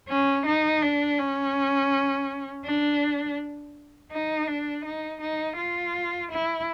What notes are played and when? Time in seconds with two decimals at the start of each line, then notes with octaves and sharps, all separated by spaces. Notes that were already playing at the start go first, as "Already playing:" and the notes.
0.08 C#4
0.45 D#4
0.82 D4
1.18 C#4
2.64 D4
4.11 D#4
4.47 D4
4.85 D#4
5.21 D#4
5.57 F4
6.31 E4